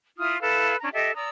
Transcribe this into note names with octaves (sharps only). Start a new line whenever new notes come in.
E4 F4 D#6 F6
E4 A4 B4 F5
C#4 D4 A#5
G4 A4 D#5 E5
D5 A#5 D#6 E6